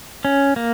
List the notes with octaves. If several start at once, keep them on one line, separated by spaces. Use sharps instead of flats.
C#4
A#3